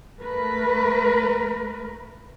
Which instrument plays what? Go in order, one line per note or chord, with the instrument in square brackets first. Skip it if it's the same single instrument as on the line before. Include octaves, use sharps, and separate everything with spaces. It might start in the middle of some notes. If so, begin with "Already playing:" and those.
[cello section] A3 A#4 B4